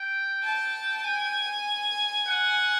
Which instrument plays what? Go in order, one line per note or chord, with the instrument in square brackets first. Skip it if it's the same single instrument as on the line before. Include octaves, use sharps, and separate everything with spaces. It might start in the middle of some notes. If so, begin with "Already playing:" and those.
Already playing: [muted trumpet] G5
[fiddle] A5
G#5
[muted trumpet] F#5